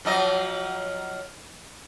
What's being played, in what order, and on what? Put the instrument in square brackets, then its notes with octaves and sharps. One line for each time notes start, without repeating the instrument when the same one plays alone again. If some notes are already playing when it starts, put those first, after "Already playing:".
[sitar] F3 F#3 D#5